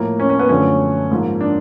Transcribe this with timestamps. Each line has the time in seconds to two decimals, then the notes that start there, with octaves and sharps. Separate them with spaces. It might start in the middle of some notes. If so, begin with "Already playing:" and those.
Already playing: A2 F3 A#3
0.20 C#4
0.30 C#4
0.39 B3
0.49 F#2 D3 F3 A3 C#4
1.11 G#2 F3 A#3
1.41 D4